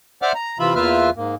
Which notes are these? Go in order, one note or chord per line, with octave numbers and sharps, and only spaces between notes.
C5 D5 E5 F#5 D6 F6
A#5
C3 E3 F4 E5 B5
E2 A#3 F4 B4 E5 F6
G#2 A#3